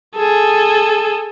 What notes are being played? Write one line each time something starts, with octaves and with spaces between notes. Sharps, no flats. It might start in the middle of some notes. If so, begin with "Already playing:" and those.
G#4 A4